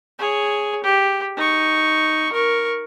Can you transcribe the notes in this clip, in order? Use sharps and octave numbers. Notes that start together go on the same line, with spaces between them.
G#4 C#5
G4
D#4 C#6
A#4 C#6